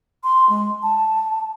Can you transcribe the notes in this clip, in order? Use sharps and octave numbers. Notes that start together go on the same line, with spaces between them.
C6
G#3
A5